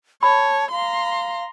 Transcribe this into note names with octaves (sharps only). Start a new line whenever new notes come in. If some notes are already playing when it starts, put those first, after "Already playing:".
C#5 A5 B5
F5 A#5 C6